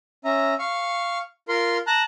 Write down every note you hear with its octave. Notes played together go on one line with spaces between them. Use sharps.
C#4 E5 A#5
F5 C#6
F4 A#4 C6
A5 A#5 F#6